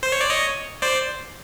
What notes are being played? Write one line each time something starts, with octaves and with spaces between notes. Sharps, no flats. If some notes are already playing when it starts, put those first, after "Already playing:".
C5
C#5
D5
C#5 D#5
C5 D5